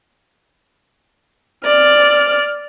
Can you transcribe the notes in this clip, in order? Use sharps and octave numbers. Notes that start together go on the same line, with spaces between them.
D5 F6